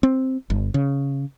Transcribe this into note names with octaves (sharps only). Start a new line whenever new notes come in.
C4
G1
C#3